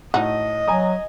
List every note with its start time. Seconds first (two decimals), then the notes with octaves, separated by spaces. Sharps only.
0.14 A2 D#4 F#4 D#5
0.68 F#3 G#5 A#5 D#6